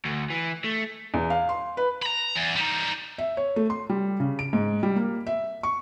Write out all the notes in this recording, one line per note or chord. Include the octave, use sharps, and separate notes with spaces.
D2
E3
A3
E2
F5
C6
B4
A#5 B5
E2
G3 D#4
E5
C#5
A3
C6
G3
C#3
D7
G#2
G3
A#3
E5
C#6